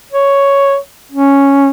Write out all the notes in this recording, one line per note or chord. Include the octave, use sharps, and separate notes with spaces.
C#5
C#4